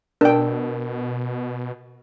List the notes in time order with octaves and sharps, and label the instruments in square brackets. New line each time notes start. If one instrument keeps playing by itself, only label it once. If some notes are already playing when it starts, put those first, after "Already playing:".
[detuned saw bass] B2 [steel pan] D4 G5 [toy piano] A#4